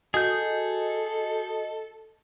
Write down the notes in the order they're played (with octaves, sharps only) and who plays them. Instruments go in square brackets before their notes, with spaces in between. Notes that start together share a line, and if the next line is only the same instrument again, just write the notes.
[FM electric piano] F#4 D#5 [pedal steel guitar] G#4 G6 [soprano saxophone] A4